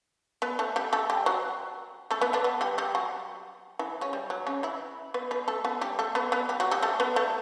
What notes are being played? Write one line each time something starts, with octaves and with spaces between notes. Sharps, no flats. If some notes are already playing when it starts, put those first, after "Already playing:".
B3 B4
A3 A4
G3 G4
A3 A4
G3 G4
F#3 F#4
A3 A4
B3 B4
D3 D4
B3
G3 G4
G3 G4
F#3 F#4
E3 E4
C#3 C#4
G3
F#3
C#3 C#4
E3 E4
B3 B4
B3 B4
A3 A4
B3 B4
G3 G4
A3 A4
B3 B4
B3 B4
G3 G4
F#3 F#4
G3 G4
A3 A4
B3 B4
A3 A4